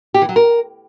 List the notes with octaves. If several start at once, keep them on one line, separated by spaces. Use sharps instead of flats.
G4
E3
F#3
A#4